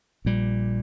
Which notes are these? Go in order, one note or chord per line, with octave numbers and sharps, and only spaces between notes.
A#1 A#2 G3